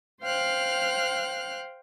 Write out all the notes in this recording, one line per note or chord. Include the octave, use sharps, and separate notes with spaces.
C5 F5 G5 F6 F#6